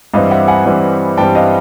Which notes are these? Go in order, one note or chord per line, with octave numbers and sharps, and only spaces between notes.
G2 E3 G3 C4 D#5 F5
E5 F#5
F#5 G#5
G2 E3 G3 C4
G2 E3 G3 C4 G5 A5
D#5 F5